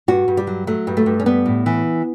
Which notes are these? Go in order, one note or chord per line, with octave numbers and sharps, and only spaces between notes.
G2 F#4
G2
G3
F#3
F#3 A3
G2
A3
G2
C#4
G3 B3
A2
E3